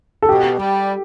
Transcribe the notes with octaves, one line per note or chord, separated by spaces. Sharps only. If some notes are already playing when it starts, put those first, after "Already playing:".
A4
B2 G4
G3